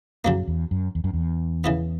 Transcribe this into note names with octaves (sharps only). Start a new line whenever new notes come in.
F#2 C#3 F#3 A#3
E2
F#2
E2
F#2
E2
C#3 E3 B3